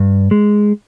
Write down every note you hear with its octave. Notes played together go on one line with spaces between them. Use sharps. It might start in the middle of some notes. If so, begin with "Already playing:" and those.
Already playing: G2
G#3